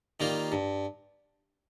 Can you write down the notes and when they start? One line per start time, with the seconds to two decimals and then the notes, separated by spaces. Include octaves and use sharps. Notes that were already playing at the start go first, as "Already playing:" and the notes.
0.20 D#3 G3 A#3 F4
0.52 G2